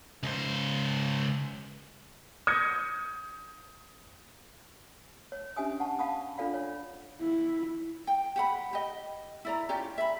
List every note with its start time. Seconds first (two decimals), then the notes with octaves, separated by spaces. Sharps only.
0.23 C#2 C5
2.47 D#6 G6 G#6 A#6 C#7
5.32 C#5
5.57 C#4 D4 G4 E5 G#5 D#6
5.80 F#5 A5 C#6
5.99 F5 F#5 A5 B5 C#6 D#6
6.37 D4 F4 A4 D5 F5 B5
6.54 C#5
7.21 E4
8.07 G5
8.36 G4 F#5 B5
8.73 G4 D#5
9.45 E4 D5 A#5
9.69 C#4 F4 G4 D5
9.98 E5 B5